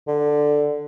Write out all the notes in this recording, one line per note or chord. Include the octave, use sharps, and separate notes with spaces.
D3